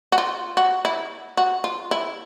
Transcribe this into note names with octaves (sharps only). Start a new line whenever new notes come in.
F#4
F4
F#4
E4
F#4
F4
E4